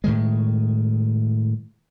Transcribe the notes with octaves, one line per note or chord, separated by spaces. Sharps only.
A2 D#3 G#3